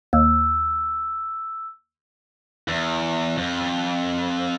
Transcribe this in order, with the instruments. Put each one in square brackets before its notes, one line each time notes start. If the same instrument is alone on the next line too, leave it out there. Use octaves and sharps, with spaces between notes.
[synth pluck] D#2 [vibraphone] E6
[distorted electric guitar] E2
F2